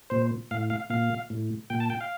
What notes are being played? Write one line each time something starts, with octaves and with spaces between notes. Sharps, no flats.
A#2 C5
A2 F5
F5
A#2 F5
A2
A#2 G5
A5
G5
F5